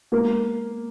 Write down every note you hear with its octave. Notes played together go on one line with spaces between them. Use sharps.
G#3 A#3 A#4